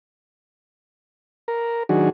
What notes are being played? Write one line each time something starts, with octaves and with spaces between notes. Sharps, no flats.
A#4
D#3 F#3 D4 F#4 G#4